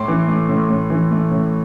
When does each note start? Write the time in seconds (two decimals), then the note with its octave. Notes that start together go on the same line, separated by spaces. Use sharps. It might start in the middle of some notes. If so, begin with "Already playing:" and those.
Already playing: A2 C6 D6
0.08 E3
0.28 A3
0.49 A2
0.70 A2
0.90 E3
1.11 A3
1.31 A2